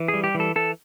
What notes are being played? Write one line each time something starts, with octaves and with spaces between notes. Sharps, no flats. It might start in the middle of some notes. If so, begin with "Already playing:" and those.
Already playing: E3
G#4
G3
G4
E3
A4
E3 A4